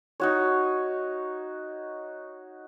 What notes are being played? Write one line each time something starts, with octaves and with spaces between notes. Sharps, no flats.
D#4 F#4 C#5